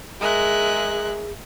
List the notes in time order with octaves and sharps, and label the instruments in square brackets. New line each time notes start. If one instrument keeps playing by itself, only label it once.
[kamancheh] G#3 F#6 [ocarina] G#4 [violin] A#4 E5